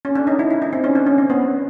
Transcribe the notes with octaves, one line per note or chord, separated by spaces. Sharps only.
C#4
D4
D#4
E4
E4
D#4
C4
C#4
D4
C#4
C4
B3